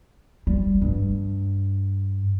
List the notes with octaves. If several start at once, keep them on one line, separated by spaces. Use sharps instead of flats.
G3
G2